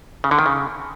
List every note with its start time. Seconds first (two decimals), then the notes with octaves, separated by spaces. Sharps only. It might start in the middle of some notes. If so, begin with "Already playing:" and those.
0.24 C#3
0.31 D3
0.39 D#3
0.46 C#3